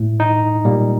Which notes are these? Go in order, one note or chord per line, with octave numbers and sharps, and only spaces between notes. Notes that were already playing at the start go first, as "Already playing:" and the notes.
Already playing: A2 A3
D#4
A#2 G3 A#3